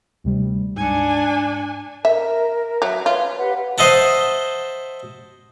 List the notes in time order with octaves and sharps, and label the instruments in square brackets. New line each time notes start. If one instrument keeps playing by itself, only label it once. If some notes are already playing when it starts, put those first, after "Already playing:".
[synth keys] D2 C3 G3
[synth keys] G#2 C#7 [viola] D4 G#5
[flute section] A#4 [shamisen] E5
[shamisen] F#3 [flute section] E5
[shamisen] F4 [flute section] B4 C#5
[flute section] G4 B4 F#5
[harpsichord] C5 D#5 E5 F#5 A5